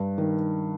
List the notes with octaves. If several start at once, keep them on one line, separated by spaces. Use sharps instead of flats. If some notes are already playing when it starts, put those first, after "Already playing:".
Already playing: G2
D#3